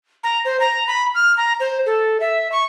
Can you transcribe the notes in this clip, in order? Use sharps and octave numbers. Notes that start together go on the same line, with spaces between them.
A#5
C5
A#5
B5
F6
A#5
C5
A4
E5
C#6